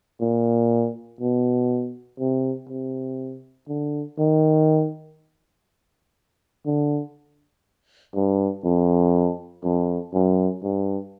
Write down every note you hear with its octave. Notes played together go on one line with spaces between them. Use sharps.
A#2
B2
C3
C3
D3
D#3
D3
G2
F2
F2
F#2
G2